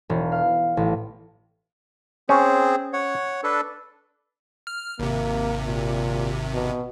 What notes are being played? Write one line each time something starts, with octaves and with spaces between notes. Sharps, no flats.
E1
F5
A1
C4 C#4 G#4 C5
C#5 F#5
D4 A4 B4
F6
G#1 C3 A#3
A#2
B2